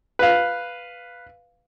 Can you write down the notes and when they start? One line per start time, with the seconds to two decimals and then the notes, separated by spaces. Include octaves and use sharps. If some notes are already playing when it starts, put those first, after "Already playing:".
0.19 B4 F5